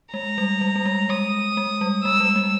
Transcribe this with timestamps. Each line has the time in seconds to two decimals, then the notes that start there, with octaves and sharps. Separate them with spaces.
0.13 G#3 A#5
0.38 G3
0.61 G3
0.76 G3
0.85 G#3
1.09 G#3 D#6
1.57 G#3
1.81 G3
2.04 G#3 E6
2.20 G3
2.36 G#3